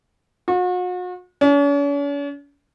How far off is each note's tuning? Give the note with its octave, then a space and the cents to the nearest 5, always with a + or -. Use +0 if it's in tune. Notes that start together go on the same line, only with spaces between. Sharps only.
F#4 -40
C#4 +45